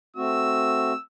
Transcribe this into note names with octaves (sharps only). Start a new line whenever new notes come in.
A3 C4 F#4 E6